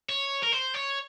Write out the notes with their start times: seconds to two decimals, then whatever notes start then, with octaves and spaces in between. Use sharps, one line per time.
0.09 C#5
0.43 A#4
0.52 C5
0.74 C#5